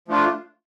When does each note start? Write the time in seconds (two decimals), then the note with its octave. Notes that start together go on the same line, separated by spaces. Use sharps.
0.08 F3 A3 D4 F4